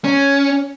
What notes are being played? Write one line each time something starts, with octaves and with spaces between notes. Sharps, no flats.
C#4